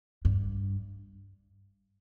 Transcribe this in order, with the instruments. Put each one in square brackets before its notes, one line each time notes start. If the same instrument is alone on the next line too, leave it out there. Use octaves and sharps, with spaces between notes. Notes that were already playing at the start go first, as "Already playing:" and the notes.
[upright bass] G2